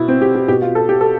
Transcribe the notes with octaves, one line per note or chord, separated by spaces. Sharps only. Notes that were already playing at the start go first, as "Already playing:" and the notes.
Already playing: B2 E4
C4
G4
G4
B2 G4
F4
A4
G4
A4